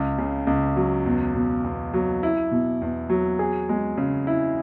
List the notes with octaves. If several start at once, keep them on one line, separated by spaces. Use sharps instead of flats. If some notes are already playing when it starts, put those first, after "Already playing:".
Already playing: C#2
C#3
C#2
F#3
E2
B2
E2
F#3
E4
B2
E2
F#3
G#4
G#3
C#3
E4